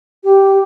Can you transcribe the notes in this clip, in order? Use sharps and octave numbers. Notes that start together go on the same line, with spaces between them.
G4